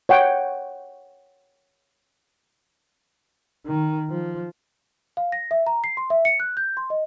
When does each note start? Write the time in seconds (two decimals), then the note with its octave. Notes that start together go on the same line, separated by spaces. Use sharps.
0.09 C#5 F#5 G5
3.67 D#3
4.10 F3
5.17 F5
5.32 A#6
5.51 E5
5.67 A#5
5.84 C7
5.97 C6
6.10 E5
6.25 C#7
6.40 F#6
6.57 G6
6.77 C6
6.90 D#5